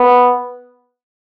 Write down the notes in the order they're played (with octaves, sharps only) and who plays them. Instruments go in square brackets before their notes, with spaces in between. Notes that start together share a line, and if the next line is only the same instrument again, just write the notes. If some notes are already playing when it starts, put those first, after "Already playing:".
Already playing: [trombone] B3